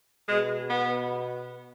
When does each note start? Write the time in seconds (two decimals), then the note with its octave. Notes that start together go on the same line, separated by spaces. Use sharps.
0.28 B2 G#3
0.68 B3